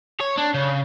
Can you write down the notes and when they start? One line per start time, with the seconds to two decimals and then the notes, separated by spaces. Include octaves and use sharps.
0.21 C#5
0.38 D4
0.54 C#3